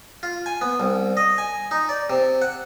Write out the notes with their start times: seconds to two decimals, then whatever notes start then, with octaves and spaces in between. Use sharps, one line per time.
0.23 F4
0.46 G#5
0.61 B3
0.80 C2
1.17 D#5
1.38 G#5
1.71 D#4
1.89 D5
2.10 C3
2.42 F#5